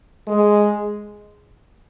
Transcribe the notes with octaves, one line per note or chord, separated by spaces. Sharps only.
G#3